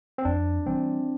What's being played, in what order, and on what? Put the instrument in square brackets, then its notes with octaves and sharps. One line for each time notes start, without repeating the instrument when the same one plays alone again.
[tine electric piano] C4
[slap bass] F2 [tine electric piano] D4
[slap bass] E3 G3 [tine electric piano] C4